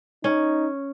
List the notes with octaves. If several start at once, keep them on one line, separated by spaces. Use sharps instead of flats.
C#4 D#4